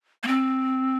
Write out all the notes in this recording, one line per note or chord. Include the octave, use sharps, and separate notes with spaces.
A#3
C4